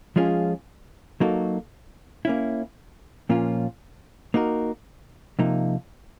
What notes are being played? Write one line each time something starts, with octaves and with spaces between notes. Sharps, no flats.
F3 G#3 C#4 F4 G#4
F#3 A#3 D#4 F#4 A4
A#3 C#4 E4
A#2 F3 A#3 C#4 F4
A#3 D#4 F#4 A#4
C3 F3 A#3 D#4